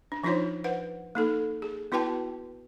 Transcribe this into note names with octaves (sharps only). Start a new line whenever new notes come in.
D4
F3 D4 D#4 F4 C5 C#5
B4 C5 F#5
A#3 D#4 A4
G#4
B3 E4 F#4 B4 G5 A5